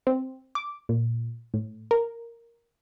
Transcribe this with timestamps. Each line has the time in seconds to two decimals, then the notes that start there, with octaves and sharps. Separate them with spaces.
0.07 C4
0.55 D6
0.89 A#2
1.54 A2
1.91 A#4